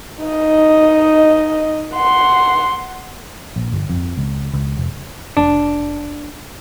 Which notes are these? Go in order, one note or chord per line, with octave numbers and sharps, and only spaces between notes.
D#4 D#5
F#5 C6
A#1
G1
F2
C#2
C#2
F1
F1 D4